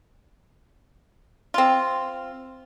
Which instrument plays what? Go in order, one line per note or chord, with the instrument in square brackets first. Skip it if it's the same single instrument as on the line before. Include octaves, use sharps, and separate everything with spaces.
[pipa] C4 F4